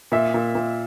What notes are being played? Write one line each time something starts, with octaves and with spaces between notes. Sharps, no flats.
A#2 E5
A#2
A#2